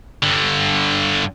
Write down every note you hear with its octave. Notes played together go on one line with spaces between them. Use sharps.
G2 D3